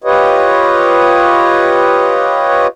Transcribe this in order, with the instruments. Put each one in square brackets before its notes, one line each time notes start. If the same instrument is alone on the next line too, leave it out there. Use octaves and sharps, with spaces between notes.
[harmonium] F4 G4 B4 C#5 D#5